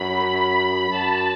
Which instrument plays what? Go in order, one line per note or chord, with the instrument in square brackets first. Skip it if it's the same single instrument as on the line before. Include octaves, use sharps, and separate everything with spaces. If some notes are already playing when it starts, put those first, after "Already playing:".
Already playing: [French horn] F#2 [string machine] B5
[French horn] F#2 [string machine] A5